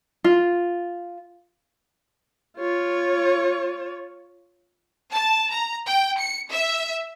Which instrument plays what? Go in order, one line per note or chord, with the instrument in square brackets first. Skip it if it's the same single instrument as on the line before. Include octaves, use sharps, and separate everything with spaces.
[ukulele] F4
[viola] F4 C#5
[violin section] A5
A#5
G5
C#7
E5